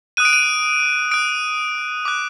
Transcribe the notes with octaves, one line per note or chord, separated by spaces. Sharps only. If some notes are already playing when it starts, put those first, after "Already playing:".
D#6 F#6 D#7
D7
D#7
D#6 F#6 D7
D6 F#6